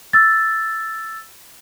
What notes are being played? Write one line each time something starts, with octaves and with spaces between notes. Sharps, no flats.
E6 A6